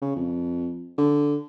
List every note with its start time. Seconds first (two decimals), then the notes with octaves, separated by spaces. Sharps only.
0.01 C#3
0.16 F2
0.98 D3